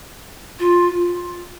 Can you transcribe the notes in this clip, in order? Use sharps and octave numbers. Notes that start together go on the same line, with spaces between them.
F4